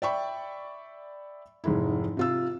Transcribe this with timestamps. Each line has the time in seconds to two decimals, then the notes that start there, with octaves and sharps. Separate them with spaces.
0.02 D5 E5 G5 B5 C#6
1.64 F1 G#2 E4
2.17 C3 F4 E6